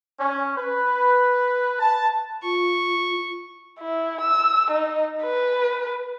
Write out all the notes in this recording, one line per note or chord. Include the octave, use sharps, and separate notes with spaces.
C#4
B4
A5
F4 C#6
E4
E6
D#4
B4